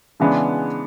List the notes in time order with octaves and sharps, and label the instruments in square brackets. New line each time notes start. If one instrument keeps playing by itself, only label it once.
[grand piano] C#3 E3 G#3 B3 D4